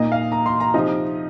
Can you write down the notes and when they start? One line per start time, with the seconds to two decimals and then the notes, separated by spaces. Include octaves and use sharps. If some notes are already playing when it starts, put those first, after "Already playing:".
Already playing: A#2 A#3 D#4 D#5
0.12 F5
0.32 A#5
0.46 C6
0.60 A#5
0.74 C3 F3 D#4 D#5